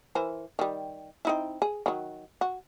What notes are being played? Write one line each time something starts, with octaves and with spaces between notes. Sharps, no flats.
E3 A#4 C5
D#3 G3
C4 D#4 E4
G#4
D#3 F#3
F#4